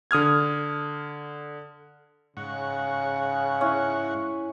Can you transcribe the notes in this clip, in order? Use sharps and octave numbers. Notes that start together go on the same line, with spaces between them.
D3 D#6 F6 G#6
G#2 C#3 F#5 C#6
C#4 E4